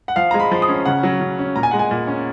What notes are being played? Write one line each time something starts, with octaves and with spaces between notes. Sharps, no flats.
F#5
F3 F5
G#3 A#5
B5
F3
D#6
C#4
C#3 F#5
F#3
C#3
C#4
A#2 A#5
G#5
G#3 F#5
G#5
A#2
C#4